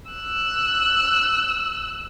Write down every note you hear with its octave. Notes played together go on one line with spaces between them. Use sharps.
E6 F#6